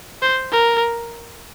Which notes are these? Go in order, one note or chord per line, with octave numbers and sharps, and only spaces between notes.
C5
A#4